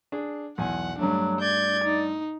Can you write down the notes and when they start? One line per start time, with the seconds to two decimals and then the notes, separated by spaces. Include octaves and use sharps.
0.12 D4 G#4
0.58 B1 E2 F#5 G#5
0.99 G2 F#3 A3 D4
1.41 D5 G6 G#6
1.84 D#4